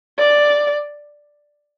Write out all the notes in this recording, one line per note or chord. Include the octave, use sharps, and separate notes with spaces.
D5